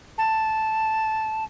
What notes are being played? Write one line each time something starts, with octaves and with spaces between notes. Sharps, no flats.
A5